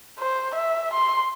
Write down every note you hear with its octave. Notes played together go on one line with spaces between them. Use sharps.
C5
E5
C6